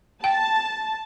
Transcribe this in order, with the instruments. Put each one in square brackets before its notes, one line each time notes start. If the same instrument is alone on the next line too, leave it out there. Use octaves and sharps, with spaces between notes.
[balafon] G5 [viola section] A5